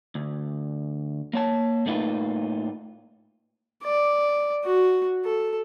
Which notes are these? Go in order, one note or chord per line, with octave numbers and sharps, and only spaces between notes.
D2
A#3 C#5 A5
A2 A3 A#3 D#4 F4 B4
D5
F#4
A4